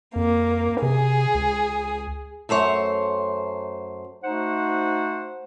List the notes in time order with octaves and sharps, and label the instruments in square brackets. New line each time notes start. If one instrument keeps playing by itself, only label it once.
[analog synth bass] F2 [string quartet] A#3
[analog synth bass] C3 [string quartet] G#4
[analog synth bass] C#2
[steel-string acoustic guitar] F#2 A3 C5 C#5
[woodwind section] A3 D#4 F#4 C5 F#5